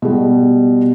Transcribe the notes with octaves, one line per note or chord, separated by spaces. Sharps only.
B2 G3